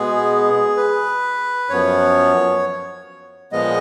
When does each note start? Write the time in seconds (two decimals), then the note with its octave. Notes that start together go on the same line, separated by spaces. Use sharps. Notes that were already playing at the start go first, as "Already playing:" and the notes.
Already playing: B2 G#3 B3 G#4
0.77 B4
1.69 F#2 F3 B3 C#5
3.52 A#2 F3 G#3 B3 D#5